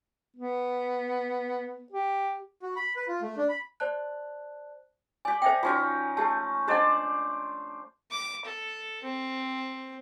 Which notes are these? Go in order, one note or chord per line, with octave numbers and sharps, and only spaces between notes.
B3
G4
F#4
B5
B4
F4
A3
D4
B5
C5 D5 A5 F#6
G4 D5 G#5
C5 D#5 E5 G5 G#5
F3 C#4 D#4 F4 F#4
A3 G4 A5
D4 G4 C5 D5 D#5 F#5
D6
A4
C4